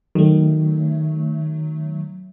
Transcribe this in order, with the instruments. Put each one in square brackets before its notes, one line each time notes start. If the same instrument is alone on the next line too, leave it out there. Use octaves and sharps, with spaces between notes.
[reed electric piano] D#3 [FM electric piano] F#3 A3